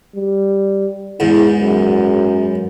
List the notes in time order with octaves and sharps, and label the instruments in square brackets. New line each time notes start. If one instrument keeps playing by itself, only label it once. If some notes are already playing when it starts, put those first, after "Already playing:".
[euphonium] G3
[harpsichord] E2 G#2 [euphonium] E4
[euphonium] F#2